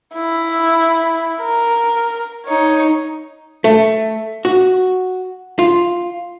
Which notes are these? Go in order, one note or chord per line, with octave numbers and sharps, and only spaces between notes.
E4
A#4
D#4 C#5
A3
F#4
F4